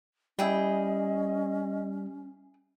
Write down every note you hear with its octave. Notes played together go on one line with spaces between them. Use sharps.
G3 C#4 E4 G#4 D#5 G5